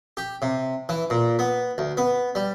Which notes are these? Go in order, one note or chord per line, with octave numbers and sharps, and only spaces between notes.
G4
C3
E3
A#2
B3
D2
B3
G3